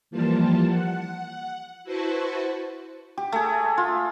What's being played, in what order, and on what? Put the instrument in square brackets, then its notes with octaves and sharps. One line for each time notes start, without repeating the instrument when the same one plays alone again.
[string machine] E3 F3 G3 A#3 F4 A5
F#5
E4 F#4 B4 C5 A5 C#6
[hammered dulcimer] G4
A3 G#4
F4